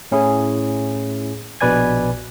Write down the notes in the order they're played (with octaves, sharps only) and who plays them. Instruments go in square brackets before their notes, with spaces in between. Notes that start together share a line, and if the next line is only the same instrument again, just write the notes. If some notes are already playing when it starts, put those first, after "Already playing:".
[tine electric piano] A2 C#4 E4 G#4
A#1 B2 B4 D5 G#5 G#6